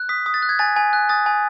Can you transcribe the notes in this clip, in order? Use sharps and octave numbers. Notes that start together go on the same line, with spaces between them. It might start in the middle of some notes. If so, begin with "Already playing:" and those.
Already playing: F#6
D#6 B6
D#6
A6
F#6
G#6
G#5 A6
G#5
F#6
D#6 A6
G#5